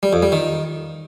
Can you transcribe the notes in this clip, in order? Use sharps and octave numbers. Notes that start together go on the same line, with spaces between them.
G3
F2
G3
D#3